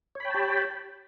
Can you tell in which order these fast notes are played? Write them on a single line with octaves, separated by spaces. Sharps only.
C#5 B5 G5 A5 G4